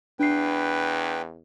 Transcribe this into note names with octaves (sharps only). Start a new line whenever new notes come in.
E2 D4 B4 G5 C7